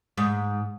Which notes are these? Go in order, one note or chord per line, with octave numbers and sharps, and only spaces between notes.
G#2